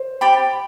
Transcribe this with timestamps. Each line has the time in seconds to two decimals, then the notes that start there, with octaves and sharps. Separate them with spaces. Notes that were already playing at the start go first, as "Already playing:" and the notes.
Already playing: C5
0.21 G4 D5 G5 B5